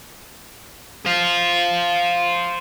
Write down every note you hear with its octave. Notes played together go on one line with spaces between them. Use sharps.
C5 F5